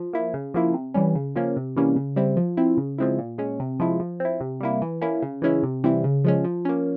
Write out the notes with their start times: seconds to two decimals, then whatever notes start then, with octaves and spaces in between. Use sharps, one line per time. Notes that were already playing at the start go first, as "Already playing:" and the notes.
Already playing: F3
0.13 A#3 E4
0.34 C#3
0.54 F3 A#3 E4
0.74 C3
0.94 E3 G3 C#4
1.15 C#3
1.36 F3 A#3 C#4
1.56 C3
1.76 E3 G3 A#3 C#4
1.96 C#3
2.16 G3 C4 E4
2.37 F3
2.57 C4 E4
2.77 C#3
2.98 F3 G#3 C4 E4
3.19 A#2
3.38 G#3 C#4
3.60 C3
3.80 F3 G#3 E4
4.00 F3
4.20 C4 E4
4.40 C3
4.60 G3 A#3 E4
4.82 E3
5.01 A#3 C#4 E4
5.22 C#3
5.42 E3 G#3 C#4 E4
5.63 C3
5.84 E3 G3 C4 E4
6.04 C#3
6.24 F3 G#3 C#4
6.44 F3
6.65 A#3 C#4